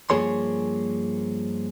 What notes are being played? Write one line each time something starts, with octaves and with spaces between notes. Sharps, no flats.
G2 F3 A#3 G#4 C#5 C6